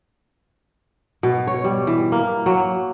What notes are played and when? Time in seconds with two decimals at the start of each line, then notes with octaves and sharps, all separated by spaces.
1.23 B2
1.47 C#5
1.64 G3
1.87 E3
2.12 A#3
2.46 F#3